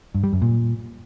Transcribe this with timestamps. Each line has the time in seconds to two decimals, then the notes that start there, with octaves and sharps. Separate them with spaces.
0.15 G2
0.24 G3
0.33 F#2
0.42 A#2